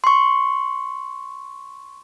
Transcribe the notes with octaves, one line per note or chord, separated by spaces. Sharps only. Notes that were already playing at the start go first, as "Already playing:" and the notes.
C6 C#6